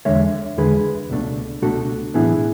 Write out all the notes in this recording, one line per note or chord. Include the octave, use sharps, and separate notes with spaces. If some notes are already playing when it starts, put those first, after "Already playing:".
E2 D3 G#3 C#5 E5
E2 D3 G#3 G#4 B4
C#2 B2 A3 D4
C#2 B2 A3 D4 F#4 A4
B1 A2 E3 B3 D4 E4 G#4